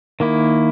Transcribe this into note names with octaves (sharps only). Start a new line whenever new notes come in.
D#3 A#3 E4